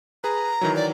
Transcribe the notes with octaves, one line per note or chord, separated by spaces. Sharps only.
G#4 B4 A#5
D#3 E3 F#3
D5